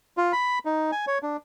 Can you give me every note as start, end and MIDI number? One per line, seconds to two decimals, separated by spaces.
0.17 0.33 65
0.33 0.59 83
0.65 0.91 63
0.92 1.05 80
1.07 1.18 73
1.23 1.37 62